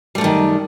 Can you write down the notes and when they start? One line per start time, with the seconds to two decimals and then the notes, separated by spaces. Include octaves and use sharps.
0.15 G3
0.18 A3
0.21 F#2
0.24 D#3